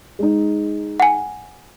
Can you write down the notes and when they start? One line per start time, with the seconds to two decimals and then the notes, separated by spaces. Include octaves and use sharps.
0.19 G#3 D#4
1.00 F#5 G#5